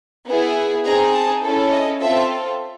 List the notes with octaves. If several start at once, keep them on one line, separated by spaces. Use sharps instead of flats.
B3 E4 G#4
C4 D#4 G#4 A#5
A5
C#4 E4 A4
D#5
C4 F4 A4 E5